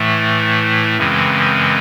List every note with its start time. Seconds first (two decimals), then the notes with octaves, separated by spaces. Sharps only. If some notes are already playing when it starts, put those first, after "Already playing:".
Already playing: A2 E3 A3
0.97 F#2 C#3 E3 G#3 C4